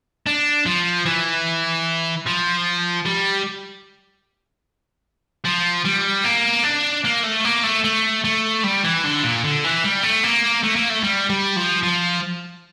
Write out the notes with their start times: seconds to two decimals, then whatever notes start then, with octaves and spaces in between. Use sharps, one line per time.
0.26 D4
0.66 F3
1.06 E3
2.26 F3
3.05 G3
5.45 F3
5.85 G3
6.25 A#3
6.64 D4
7.05 A#3
7.24 A3
7.45 A#3
7.64 A3
7.84 A3
8.24 A3
8.64 G3
8.84 E3
9.04 D3
9.23 A#2
9.44 D3
9.64 E3
9.84 G3
10.03 A3
10.24 A#3
10.63 A3
10.76 A#3
10.90 A3
11.03 G3
11.30 G3
11.56 F3
11.83 F3